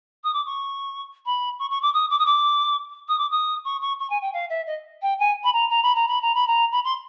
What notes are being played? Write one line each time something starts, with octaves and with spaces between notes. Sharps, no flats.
D#6
D6
C#6
B5
C#6
C#6
D6
D#6
D6
D#6
D6
D#6
D6
D#6
C#6
C#6
C#6
G#5
G5
F5
E5
D#5
G5
G#5
B5
A#5
A#5
B5
A#5
B5
A#5
B5
A#5
B5
C6